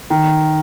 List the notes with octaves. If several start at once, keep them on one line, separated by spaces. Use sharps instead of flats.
D#3